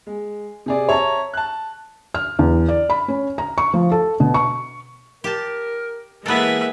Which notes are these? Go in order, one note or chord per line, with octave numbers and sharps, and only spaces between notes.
G#3
C3 G#4 D5
C#5 E5 A5 A#5
A5 F#6
F6
E2
D5
B5
C#4
A#5
C#6
F3
A4
B2
C#6
G4 A#4 A5
E3 G#3 A#3 B3 G#4 A4 B4 E5